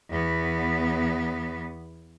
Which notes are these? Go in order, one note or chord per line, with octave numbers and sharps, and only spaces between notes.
E2 B3